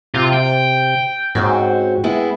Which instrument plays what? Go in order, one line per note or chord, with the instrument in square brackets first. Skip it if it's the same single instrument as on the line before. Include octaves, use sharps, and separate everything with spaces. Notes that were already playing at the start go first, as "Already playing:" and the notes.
[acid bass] C3 [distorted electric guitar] F4
[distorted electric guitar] G5
[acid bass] G#2 [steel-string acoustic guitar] C4 C#4 F#4
[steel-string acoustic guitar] G#3 B3 E4